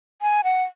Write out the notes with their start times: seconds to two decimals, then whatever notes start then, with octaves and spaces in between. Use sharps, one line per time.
0.22 G#5
0.44 F#5